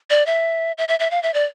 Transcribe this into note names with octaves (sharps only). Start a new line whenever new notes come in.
D5
E5
E5
E5
E5
F5
E5
D5